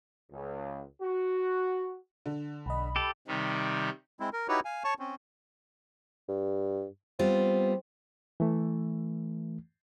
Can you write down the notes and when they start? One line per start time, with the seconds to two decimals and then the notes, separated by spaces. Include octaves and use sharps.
0.32 C#2
1.03 F#4
2.26 D3
2.66 B1 D#5 B5
2.96 G4 A4
3.27 C3 D#3 G3
4.20 G#3 C4 E4
4.33 A#4
4.48 D#4 E4 F#4 G4 B4 C#5
4.65 F5 G#5
4.84 C#5 A5 C#6
4.99 C4 C#4
6.29 G2
7.19 G3 B3 C4 F4
8.40 E3 A3